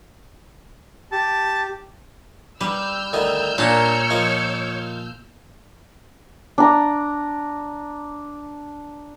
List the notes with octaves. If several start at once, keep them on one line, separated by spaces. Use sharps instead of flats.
G4 A5
G3 B4 E6 F6 G6
D2 D#3 D#5
A#2 D4 C#5 F5
F3 A#4 D#5
D4 A#5